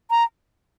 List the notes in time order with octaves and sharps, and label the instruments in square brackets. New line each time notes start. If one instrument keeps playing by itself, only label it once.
[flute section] A#5